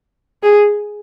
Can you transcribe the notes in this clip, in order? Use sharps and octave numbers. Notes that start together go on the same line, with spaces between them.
G#4